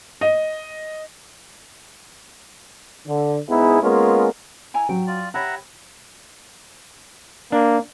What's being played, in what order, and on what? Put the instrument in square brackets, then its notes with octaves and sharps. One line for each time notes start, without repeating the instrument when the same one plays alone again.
[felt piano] D#5
[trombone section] D3
G#2 B3 D#4 E4 G#4
G#3 A#3 B3 C#4 F4 A#4
[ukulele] E4 G#5 A#5
[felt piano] F#3 [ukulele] G5
[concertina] F4 D5
[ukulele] G4 C#5 [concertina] E5 F#5 A#5 [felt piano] B5
[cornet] A#3 [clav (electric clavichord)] D4